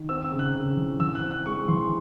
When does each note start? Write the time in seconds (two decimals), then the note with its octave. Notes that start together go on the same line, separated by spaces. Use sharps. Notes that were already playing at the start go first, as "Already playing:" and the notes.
Already playing: D#3
0.09 C4 E6
0.25 E6
0.32 C#3
0.39 F#6
0.55 C#3
0.77 E3
1.00 E3 E6
1.15 F#6
1.23 C4
1.31 F#6
1.46 G#3 C#6
1.68 E3 C6